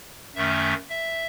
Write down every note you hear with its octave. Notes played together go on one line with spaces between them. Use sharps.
F#2 D#3 A3 C#4 E5
E5